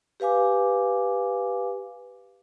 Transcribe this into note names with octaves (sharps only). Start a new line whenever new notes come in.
G4 B4 F5 G#5 D6